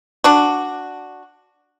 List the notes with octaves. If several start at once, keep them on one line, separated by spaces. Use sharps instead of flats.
D4 F#4